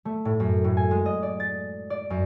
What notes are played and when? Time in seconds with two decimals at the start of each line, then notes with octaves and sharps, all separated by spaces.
0.05 A3
0.25 A2
0.40 F#2
0.64 A2
0.77 G#5
0.91 G#3
1.06 D#5
1.23 D5
1.40 A6
1.90 D5
2.10 F#2